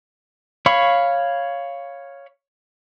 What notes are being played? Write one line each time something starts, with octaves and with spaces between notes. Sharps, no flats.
C#5 F5 B5 C#6